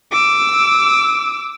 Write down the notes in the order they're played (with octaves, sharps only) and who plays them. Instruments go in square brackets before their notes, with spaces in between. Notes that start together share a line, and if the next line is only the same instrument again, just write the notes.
[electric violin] D6 E6